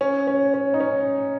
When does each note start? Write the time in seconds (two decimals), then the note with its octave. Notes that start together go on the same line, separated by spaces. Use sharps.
0.01 C#4
0.27 C#4
0.54 C#4
0.74 D#4
0.80 C#4